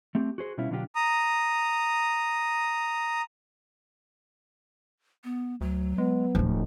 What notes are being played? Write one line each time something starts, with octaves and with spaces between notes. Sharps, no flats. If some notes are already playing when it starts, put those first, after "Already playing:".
A3 C4 G4
F#4 G#4 C5
B2 G3 C#4 E4 F4
B2 D3 F#3 D4 F4 G4
A#5 D#6
B3
D2 F#3
G#3 B3
D1 F3 F4